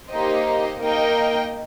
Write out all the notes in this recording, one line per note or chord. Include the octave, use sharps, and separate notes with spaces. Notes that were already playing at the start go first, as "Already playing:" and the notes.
A#3 D#4 G4 C5 D#5
A#3 D#4 A#4 D#5 G5